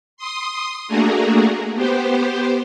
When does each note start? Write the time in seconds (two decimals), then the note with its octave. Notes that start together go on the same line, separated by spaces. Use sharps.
0.17 C6 D#6
0.88 A3 A#3 D4 F#4 G#4 A#4
1.74 B3 G4 C5